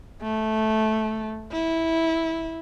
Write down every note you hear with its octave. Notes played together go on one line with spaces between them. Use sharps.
A3
E4